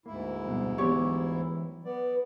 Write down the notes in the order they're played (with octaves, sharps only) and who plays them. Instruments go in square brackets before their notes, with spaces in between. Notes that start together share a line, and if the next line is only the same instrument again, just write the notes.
[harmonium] D2 G#2 E4 [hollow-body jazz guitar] A#3
[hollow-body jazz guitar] F2 B2 [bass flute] G3
[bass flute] E3 [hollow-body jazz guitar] F#3 B3 C6 [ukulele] G4 C#5 D5
[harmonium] B3 D5 [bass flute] B4